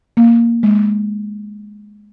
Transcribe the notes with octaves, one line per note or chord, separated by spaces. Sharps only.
A#3
G#3